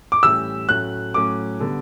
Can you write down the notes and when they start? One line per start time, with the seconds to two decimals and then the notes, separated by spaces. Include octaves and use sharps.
0.12 D6
0.23 A2 E3 G3 C#4 G4 E6
0.69 A2 F#3 A3 C#4 F#6
1.14 A2 F#3 A3 C#4 D6
1.60 D3 G3 B3